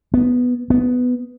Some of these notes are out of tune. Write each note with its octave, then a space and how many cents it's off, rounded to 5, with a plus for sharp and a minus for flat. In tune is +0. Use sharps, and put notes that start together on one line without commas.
B3 +0
B3 +10